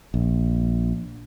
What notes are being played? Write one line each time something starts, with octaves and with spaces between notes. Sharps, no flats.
A#1